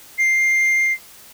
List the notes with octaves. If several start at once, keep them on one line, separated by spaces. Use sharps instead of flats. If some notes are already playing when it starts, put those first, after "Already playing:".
C7